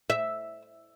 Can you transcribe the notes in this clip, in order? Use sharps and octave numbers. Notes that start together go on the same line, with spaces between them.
E5